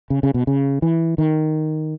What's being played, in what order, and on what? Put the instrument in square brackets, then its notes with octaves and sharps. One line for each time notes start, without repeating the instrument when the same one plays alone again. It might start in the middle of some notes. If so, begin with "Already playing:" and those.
[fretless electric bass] C#3
C#3
B2
C#3
E3
D#3